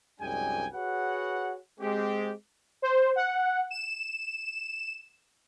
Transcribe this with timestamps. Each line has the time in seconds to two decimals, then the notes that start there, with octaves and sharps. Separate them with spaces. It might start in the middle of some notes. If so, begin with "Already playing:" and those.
0.21 C2 F#2 G#3 D4 G5 G#5
0.74 F#4 G#4 B4 C#5 F#5
1.80 G#3 C4 G4
2.82 C5
3.16 F#5
3.70 E7